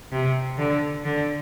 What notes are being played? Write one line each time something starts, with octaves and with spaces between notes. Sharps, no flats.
C3
D3
D3